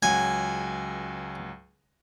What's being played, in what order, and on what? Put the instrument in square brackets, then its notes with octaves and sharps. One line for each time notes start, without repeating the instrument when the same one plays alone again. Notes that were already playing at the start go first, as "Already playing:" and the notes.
[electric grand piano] C#2 F#3 F#5 [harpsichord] G#5